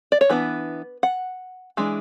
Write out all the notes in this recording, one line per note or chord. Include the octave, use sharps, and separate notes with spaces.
D5
C#5
E3 B3 D4 B4
F#5
E3 G#3 D4